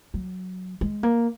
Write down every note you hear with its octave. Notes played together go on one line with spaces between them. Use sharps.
F#3
G#3
A#3